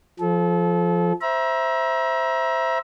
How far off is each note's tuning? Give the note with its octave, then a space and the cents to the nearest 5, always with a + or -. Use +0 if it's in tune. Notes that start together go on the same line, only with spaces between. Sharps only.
F3 +0 A4 -30
C5 +0 E5 +0 A#5 +35